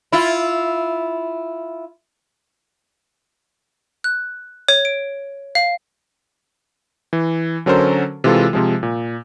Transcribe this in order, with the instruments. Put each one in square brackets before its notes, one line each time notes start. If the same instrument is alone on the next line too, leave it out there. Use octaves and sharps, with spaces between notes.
[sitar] E4 F4
[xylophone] F#6
C#5
D7
F5
[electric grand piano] E3
D3 F#3 C#4 A4 A#4 C5
C3 E3 G#3 F4 A4
C3 F3 G#3
A#2